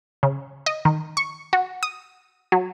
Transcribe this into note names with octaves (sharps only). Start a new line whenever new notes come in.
C#3
D#5
D#3
C#6
F#4
D#6
F#3